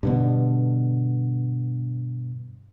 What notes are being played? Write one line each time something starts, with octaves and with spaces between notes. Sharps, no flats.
G2 B2 D3